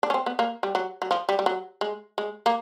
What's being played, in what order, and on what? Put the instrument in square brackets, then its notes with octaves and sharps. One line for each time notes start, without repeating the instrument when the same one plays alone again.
[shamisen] D4
C#4
C4
B3
A#3
G3
F#3
F#3
F3
G3
G3
F#3
G#3
G#3
A#3